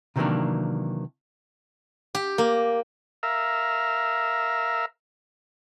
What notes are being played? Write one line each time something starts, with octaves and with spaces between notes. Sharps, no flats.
C3 D#3 E3 F#3 A#3 D4
G4
A#3
A#4 E5 F5